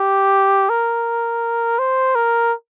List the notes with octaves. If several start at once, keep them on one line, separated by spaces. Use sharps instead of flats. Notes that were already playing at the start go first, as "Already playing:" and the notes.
Already playing: G4
A#4
C5
A#4